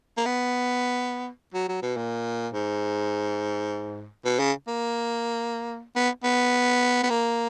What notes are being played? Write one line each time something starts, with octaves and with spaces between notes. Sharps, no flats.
A#3
B3
F#3
F#3
B2
A#2
G#2
B2
C#3
A#3
B3
B3
B3
A#3